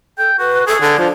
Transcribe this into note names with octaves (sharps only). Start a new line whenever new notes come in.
A4 G5
F#4 B4
G#4 A4
D3 D4
F3